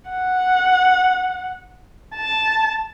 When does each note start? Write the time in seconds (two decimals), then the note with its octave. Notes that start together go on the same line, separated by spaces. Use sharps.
0.11 F#5
2.16 A5